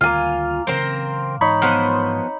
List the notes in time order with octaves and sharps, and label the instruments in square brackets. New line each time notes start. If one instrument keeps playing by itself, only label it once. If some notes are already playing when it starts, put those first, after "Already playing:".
[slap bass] D2 D#3 G3 [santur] A#3 F5 [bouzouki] F4 G#5
[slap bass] C#3 E3 F#3 [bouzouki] C4 A#4 C5
[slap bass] G#2 E3 [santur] D#4 C#5 B5
[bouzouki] F3 B3 C5